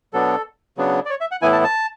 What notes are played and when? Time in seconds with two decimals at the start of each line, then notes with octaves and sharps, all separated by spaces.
0.13 B2 F#3 B3 D4 A4
0.77 C#3 F#3 B3 D4
1.06 D5
1.10 C#5
1.21 E5
1.31 F#5
1.41 A2 E3 B3 E4 G#5
1.53 A5
1.64 A5